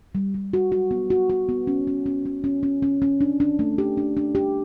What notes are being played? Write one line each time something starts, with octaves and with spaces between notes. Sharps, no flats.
G3
G3
F#4
F#4
B3
F#4
F#4
B3
C#4
C#4
C#4
C#4
C#4
C#4
C#4
C#4
D4
D4
A3
G4
D4
D4
G4